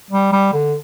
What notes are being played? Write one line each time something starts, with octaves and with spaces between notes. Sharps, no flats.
G3
G3
D3